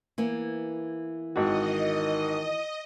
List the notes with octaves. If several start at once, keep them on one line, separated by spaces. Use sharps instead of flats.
E3 A#3 B3
G#1 D#3 F#4 D#5